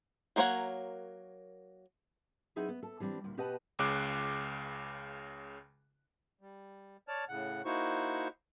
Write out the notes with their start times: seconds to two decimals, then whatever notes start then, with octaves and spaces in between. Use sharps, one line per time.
0.36 F#3 A#3 A#4 C#5 F#5
2.56 F#3 C4 D#4 E4 G#4 B4
2.69 B3
2.83 A4
3.00 E3 G3 C4 D4
3.24 D2 A#2
3.37 B2 G4 B4 D#5 F#5 A5
3.79 C#2 C#3 D6 F#6
6.41 G3
7.08 C#5 D5 A5 F6
7.29 A2 C#3 F#5
7.65 A#3 D#4 E4 F#4 C5 C#6